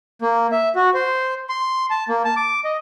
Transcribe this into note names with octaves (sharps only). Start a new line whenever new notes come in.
A#3
E5
F#4
C5
C6
A5
A#3
A5
D6
D#5